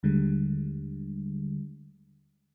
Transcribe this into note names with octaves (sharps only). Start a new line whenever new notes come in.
D#2 D3 G3 G#3